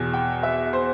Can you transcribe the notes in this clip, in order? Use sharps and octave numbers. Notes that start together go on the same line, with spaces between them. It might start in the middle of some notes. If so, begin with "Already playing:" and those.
Already playing: E2 B2
G5
E5
C5